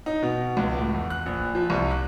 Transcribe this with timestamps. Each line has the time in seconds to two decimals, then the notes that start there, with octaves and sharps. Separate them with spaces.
0.06 D#4
0.23 B2
0.57 C#2
0.79 A2
0.94 E2
1.10 F#6
1.26 A#1
1.55 F3
1.70 C2
1.91 F#6